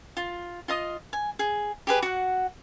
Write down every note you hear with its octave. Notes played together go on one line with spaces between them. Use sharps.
F4
F4 D#5 D#6
G#5
G#4
G4 G#4 B4
F#4 F#5